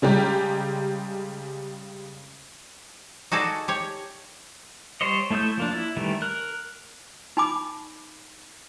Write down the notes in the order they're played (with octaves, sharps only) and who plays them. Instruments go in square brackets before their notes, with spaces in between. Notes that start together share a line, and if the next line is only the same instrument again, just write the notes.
[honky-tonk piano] C#3 G3 G#3 G4 A#5
[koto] D#4 F#4 G#4 A4 D5
G4 C#5
[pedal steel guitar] G3 C5 C#5 D#5
A3 E4 E5 D#6 G6
F3 A#3 D4
E4
D#3 E3 G3 A3
A#4 F#6
[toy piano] D#4 G#5 B5 D6